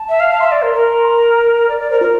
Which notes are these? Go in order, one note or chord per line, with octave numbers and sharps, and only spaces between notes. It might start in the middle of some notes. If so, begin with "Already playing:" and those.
Already playing: A5
E5
F5
F5
E5 C6
D5
A#4
A#4
A#5
D5
D5
A#4 C5
F4 A#4